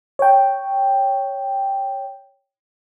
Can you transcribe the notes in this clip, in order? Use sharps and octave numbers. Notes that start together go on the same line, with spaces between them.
C#5 G5